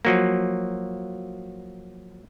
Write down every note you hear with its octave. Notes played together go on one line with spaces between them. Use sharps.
F3 F#3 A#3